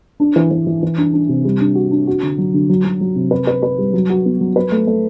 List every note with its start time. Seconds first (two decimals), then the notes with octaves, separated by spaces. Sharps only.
0.20 D4
0.36 E3
0.51 E3
0.67 E3
0.83 E3
0.98 D4
1.13 D4
1.29 C3
1.45 G3
1.61 D4
1.75 F#4
1.91 D4
2.07 F#4
2.23 D3
2.38 F#3
2.54 D3
2.69 F#3
2.84 F#3
3.01 F#3
3.16 C3
3.31 B4
3.47 B4
3.63 B4
3.78 G3
3.93 F#3
4.10 F#4
4.26 B3
4.41 F#3
4.56 B4
4.72 A3
4.87 A3